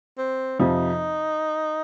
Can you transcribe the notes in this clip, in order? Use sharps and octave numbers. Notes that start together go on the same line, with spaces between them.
C4
F2 C3 F3 D#4